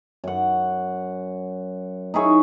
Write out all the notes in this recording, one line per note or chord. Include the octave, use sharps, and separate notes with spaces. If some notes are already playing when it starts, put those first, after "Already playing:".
F#2 F#5
D#4 E4 G#4 C#5